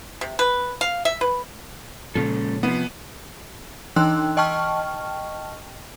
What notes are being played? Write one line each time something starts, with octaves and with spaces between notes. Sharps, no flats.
C3
B4
F5
E5
B4
A#2 C#3 F3 G#3 C#4 A4
C3 F3 B3
E3 D#4 G5 C6 E6 F#6
D#5 G5 A5 C#6 F6